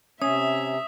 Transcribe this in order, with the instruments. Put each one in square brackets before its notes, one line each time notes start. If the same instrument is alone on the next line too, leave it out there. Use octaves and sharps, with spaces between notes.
[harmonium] C3 [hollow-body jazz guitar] C#4 [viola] E5 [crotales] D#6